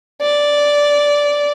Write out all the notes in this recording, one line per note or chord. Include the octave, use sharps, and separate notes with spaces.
D5